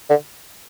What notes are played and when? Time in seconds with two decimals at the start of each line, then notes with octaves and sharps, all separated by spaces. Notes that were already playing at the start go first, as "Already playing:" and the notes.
0.10 D3